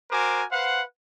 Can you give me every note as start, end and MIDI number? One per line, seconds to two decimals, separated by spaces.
0.11 0.44 66
0.11 0.44 70
0.11 0.44 72
0.11 0.44 80
0.11 0.44 86
0.52 0.83 71
0.52 0.83 72
0.52 0.83 77
0.52 0.83 78